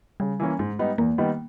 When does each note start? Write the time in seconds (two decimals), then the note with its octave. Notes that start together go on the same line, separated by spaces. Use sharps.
0.20 C#3 G3
0.40 E3 A#3 C#4
0.59 G#2 G#3
0.79 G3 B3 D#4
0.98 E2 A#3
1.18 D#3 G3 B3 D#4